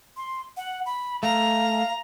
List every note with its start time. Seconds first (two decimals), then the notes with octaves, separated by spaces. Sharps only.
0.17 C6
0.57 F#5
0.86 B5
1.23 A3 F5 A#5